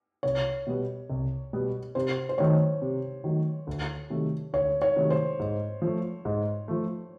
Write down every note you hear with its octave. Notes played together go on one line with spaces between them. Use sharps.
C2 C#5
B2 G3 B3
C2
B2 G3 B3
C3 C5
C5
D#3 F#3 A3 C#5
C3
D#3 F#3 A3
D2
C3 D#3 F#3 A3
D2 C#5
C#5
C3 D#3 F#3 A3
C5
G#2
F3 A3
G#2
F3 A3